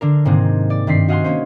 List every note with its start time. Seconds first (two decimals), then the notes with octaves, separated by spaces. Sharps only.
0.01 D3 D4 A#4
0.25 G#2 C3 D#3 A#3 C4 G#4
0.70 D5
0.87 G2 D#3 C4 B6 C7
1.08 F#4 D#5 F5 F#5 G#5 C6
1.24 A#3 C#4 C5